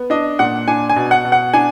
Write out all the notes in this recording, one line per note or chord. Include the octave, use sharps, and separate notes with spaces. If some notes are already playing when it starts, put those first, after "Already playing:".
Already playing: B3
D4 D#5
A#2 F#5
D4 G#5
G#5
B2
F#5
B2
F#5
D4 G#5